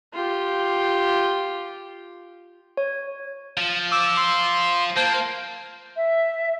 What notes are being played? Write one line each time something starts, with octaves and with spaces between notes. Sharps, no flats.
F4 G4
C#5
F3
D6 E6
C6
A#3 C5 A5
E5